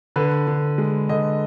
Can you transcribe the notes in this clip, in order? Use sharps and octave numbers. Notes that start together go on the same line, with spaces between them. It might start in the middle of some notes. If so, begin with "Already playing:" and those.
D3 B4
D3
G#3
D3 D#5